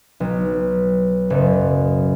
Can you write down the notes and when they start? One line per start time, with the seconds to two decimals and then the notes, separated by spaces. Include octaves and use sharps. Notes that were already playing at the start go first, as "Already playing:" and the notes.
0.20 B1
1.30 F#1